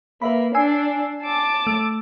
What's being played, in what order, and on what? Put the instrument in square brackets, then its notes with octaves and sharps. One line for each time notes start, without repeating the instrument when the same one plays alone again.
[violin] A#3 [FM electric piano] B4 E5 B5
[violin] D4 [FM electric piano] G#5 E6 C7
[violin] A5 D6
[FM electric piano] A3 E6